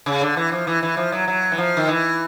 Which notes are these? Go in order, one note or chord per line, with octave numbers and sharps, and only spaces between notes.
C#3
D3
E3
F3
E3
E3
F3
F#3
F#3
E3
F3
D#3
E3